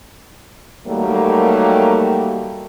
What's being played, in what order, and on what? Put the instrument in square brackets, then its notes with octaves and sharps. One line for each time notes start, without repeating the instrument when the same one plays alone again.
[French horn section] D#3 F#3 G3 A3 A#3